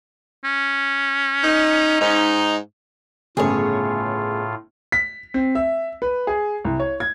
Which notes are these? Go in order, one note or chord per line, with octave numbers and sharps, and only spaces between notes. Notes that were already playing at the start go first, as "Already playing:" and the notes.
C#4
D#4
G#2 D#4
G1 A2 C#3 A3 F4 G#4 C#5
B6
C4
E5
B4
G#4
C2
C#5
G#6